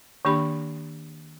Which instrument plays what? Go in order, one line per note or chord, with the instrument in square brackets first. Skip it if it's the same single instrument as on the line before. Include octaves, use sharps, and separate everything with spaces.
[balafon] D#3 A#3 D4 G4 B5